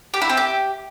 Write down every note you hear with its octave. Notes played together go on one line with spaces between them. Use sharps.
G4
E4
C4
G4